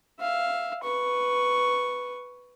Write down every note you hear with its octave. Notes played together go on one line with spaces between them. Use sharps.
E5 F5
B4 C#6